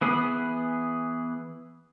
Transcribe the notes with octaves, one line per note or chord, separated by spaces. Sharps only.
E3 B3 G#4